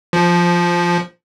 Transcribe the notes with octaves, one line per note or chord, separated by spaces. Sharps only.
F3